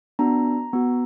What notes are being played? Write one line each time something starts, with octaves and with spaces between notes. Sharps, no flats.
B3 D4 F#4 A#5
B3 F#4